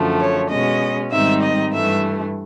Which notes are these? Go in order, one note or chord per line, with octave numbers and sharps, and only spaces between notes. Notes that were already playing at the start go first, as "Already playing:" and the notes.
Already playing: F#2 D3 F3 A3
C#5
B2 G#3 C#4 D#5
G#2 D#3 G3 C4 D#4 E5
D#5
G2 E3 A3 E5